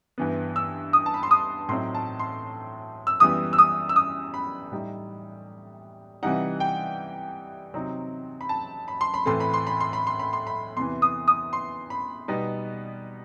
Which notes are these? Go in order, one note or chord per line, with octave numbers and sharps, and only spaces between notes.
G2 E3 B3
E6
D#6
A5
B5
C6
D#6
A2 F#3 C4 D#4 C6
A5
C6
E6
F#2 E3 G3 B3 D#6
E6
D#6
E6
D#6
B5
A2 G3 D#4
C3 E3 G3 D#4 F#5
G5
C3 F#3 C4 D#4
B5
A5
B5
C6
B5
A2 E3 A3 C4 C6
B5
C6
B5
C6
B5
C6
B5
C6
B5
E2 C3 E3 C6
D#6
D#6
C6
B5
B2 G3 B3 D#4